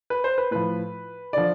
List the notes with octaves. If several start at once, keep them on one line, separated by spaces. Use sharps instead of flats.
B4
C5
B4
A2 F3 B4
D3 F3 D5